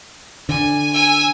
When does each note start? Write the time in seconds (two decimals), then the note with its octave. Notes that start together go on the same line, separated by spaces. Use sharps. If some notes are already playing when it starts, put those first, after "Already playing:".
0.49 D3 G#5
0.93 G#5 E6